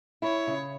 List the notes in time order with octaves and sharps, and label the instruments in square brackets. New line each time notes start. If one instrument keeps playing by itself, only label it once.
[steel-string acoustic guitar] E4 [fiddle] C#5
[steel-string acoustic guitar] C#3